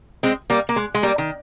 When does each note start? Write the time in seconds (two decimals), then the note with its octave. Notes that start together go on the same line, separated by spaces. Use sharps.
0.23 G#3 C4
0.50 G3 A#3
0.69 A#3
0.76 G#3
0.94 G#3
1.03 G3 A#3
1.18 D#3